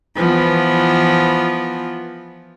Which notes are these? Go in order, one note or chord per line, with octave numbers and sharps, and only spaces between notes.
E3 F3 B3